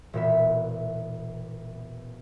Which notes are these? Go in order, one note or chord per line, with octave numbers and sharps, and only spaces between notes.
E1 A#2 B3 E5